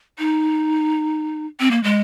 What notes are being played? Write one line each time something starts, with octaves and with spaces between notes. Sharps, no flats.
D#4
C4
A#3
G#3